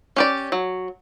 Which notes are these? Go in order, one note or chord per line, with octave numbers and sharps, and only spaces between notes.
C#4 G4 D5
F#3